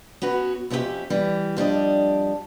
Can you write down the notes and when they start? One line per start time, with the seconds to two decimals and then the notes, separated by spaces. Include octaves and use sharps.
0.22 B3 C#4 F#4 B4
0.70 F2 G#3 C#4 E4 G4 E5
1.10 E3 G3
1.57 F2 G3 D4 D#5